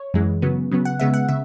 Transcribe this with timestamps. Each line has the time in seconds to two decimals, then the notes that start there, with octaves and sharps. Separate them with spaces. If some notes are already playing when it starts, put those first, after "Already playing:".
Already playing: C#5
0.14 F#2 E3 G#3
0.42 C#3 F#3 B3
0.71 C#3 F#3 B3
0.85 F#5
0.99 C#3 G#3 B3 E5
1.14 F#5
1.29 C#3 E5